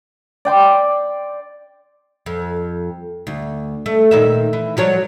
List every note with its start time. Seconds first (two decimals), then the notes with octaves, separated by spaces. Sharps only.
0.45 D5 G5 C6
2.26 F2
3.27 D2
3.86 A3
4.11 A#2 D#3 E5
4.53 E3
4.77 F3 F#3 C#5